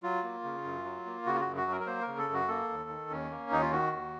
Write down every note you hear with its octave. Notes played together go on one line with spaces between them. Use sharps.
F#3 F4
A#3
C#3
F#2
F#3
A#3
C#3 F#4
F4
F#4
F#2
F#4
F#3 A#4
A#4
A#3 C5
A#4
C#3
A4
F#2 F#4
A#3 A4
D#2
D#3
D#2 C#4
A#3
D#2 D#4
F4
D#3 F#4
D#2